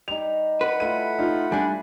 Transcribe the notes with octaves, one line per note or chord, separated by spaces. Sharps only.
G3 D#4 F7
B4 F#5 B5
A3 E4 F4 D#7
A2 D#4 F4
G3 D4 G#5